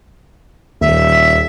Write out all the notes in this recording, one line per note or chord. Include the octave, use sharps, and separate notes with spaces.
D#1 D#2 E5